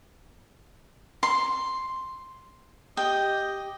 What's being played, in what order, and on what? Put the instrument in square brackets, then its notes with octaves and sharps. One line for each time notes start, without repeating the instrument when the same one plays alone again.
[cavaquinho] C6
[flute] G4 [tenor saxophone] D#5 [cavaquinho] G5